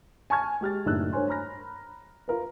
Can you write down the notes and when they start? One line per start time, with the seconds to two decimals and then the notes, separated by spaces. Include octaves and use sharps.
0.30 G#5 A5 C#6 F6 G#6
0.61 G#3 G4 F6 A6
0.85 F#1 A2 D#3 D4 E6 F#6
1.12 G2 A#4 C5 C#5 G#5 C6
1.28 A#5 B5 F6 A#6
2.28 F4 A#4 B4